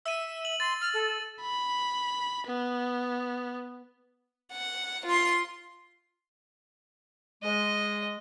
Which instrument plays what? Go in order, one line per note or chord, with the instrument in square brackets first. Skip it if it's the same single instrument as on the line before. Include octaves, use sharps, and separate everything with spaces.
[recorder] E5 [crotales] E6 D#7
[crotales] F#7
[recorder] C6 [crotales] A6
[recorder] F6
A4
[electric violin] B5
B3
[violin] F#5
F4 C6
[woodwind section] G#3 [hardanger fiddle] D#5